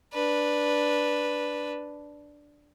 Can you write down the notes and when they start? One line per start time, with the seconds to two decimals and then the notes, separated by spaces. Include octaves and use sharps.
0.13 D4 B4